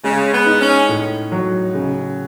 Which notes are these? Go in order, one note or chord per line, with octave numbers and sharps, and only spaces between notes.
C#3 G#3
B3
D#4
C#4
A2
F#3
C#3